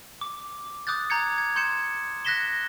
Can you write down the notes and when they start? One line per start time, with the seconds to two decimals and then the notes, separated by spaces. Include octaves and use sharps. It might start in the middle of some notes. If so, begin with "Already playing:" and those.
0.21 D6
0.87 D6 D#6 F#6 G6 A6
1.10 A#5 G6 G#6 C#7
1.38 G#6
1.56 C6 G6 G#6 C#7 E7
2.25 F#6 G#6 A#6 B6 E7 G7